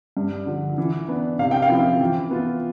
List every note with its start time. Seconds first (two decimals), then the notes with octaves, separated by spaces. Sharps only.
0.17 G2
0.46 D3 F3
0.78 E3
1.08 B3 D4
1.39 C3 F5
1.51 G5
1.62 F5
1.70 F3 C4 E4
2.00 E3
2.31 B3 F4